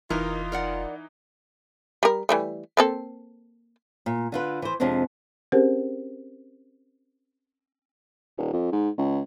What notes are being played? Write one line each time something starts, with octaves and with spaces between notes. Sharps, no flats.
F1 E3 D#4 F4 A#4
A#4 D5 F#5
G3 A#4
E3 G3 A3
A#3 C4 A4
A#2
D3 F4 B4
E3 C5
F2 C3 G#3 C4 D4
C4 C#4 G4 G#4 A#4 C5
D#1
F2
G#2
C#2